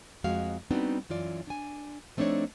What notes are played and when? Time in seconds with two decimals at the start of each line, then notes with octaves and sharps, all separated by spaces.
0.24 F2 G#3 F#4 F5
0.70 G3 B3 C4 D4 D#4 F#4
1.09 F#2 E3 F4 D5
1.47 D4 G#5
2.17 F3 A3 C4 D4 D#4 C#5